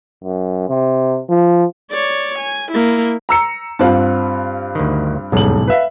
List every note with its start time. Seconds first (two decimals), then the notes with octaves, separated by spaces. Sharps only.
0.24 F#2
0.69 C3
1.29 F3
1.91 C#5 D5
2.39 G#5
2.72 A#3 E4
3.29 A#5 E6 C#7
3.79 G2 C4 F4 F#5 A5
4.75 D2 D#3
5.32 D#1 B1 E2 G#2 F#7
5.68 B4 E5 F5